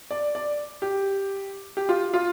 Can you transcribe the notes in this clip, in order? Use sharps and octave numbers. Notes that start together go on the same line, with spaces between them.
D5
D5
G4
G4
F4
F4